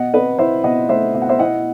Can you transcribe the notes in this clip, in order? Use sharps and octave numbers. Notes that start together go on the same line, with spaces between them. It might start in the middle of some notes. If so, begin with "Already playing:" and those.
Already playing: B2 D#5 F#5
C4 B4 D#5
E4 C5 E5
B2 D#5 F#5
A3 C5 E5
B2 E5
F#5
C5 E5
E4 D#5 F#5